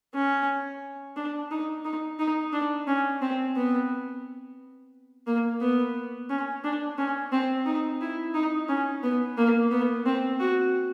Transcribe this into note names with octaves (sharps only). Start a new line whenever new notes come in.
C#4
D4
D#4
D#4
D#4
D4
C#4
C4
B3
A#3
B3
C#4
D4
C#4
C4
D#4
E4
D#4
C#4
B3
A#3
B3
C4
F#4